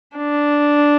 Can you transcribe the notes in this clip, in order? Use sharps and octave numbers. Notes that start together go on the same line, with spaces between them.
D4